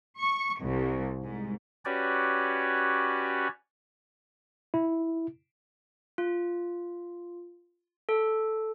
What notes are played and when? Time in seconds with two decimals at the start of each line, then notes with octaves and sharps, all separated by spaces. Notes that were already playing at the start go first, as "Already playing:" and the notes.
0.19 C#6
0.62 C2
1.23 G#2
1.85 C#4 F#4 G4 B4 C#5 D5
4.74 E4
6.18 F4
8.09 A4